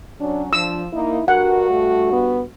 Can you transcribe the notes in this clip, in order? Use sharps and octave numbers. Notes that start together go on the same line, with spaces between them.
F#3 C#4 D4
F3 D4 E6
A#3 D#4 E4
G2 F#4 A#4 F#5
A3
B3